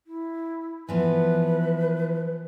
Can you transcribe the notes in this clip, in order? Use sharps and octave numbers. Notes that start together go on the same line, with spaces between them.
E4
E3 F3 B3 B4